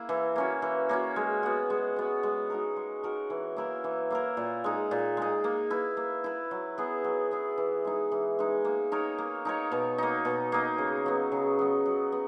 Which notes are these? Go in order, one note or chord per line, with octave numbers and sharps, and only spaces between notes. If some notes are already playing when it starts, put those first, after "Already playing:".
Already playing: A#3 E4
E3
A#3 C#4 F#4
E3
A#3 C#4 F#4
G#3
B3 F#4
G#3
B3 F#4
G#3
D#4 F#4 A#4
G#3
D#4 F#4 A#4
E3
A#3 E4 A#4
E3
A#3 E4 A#4
A#2
G#3 D#4
A#2
G#3 D#4
A#3
E4 B4
A#3
E4 B4
F#3
B3 E4 G#4
F#3
B3 E4 G#4
E3
G#3 D#4
E3
G#3 D#4
A#3
D#4 A#4 C#5
A#3
D#4 A#4 C#5
B2
A#3 D#4
B2
A#3 D#4
C#3
F#3 B3
C#3
F#3 B3
F#3
B3